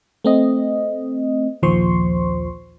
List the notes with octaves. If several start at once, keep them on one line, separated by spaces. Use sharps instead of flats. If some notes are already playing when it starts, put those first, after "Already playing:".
A3 C4 D#5
A#1 D#2 F3 C5 C6 C#6